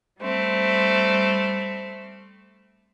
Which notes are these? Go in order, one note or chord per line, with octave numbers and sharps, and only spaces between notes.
G3 A3 C4